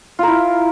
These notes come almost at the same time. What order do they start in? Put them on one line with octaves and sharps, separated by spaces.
F4 A#4 E4